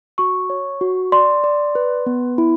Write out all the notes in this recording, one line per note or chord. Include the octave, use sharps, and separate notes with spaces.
F#4 C#6
C#5
F#4
D5 C6
D5
B4
B3
E4